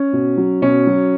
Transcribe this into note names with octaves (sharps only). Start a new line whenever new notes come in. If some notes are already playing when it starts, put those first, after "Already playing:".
Already playing: C#4
B2
F#3
B2 C#4
F#3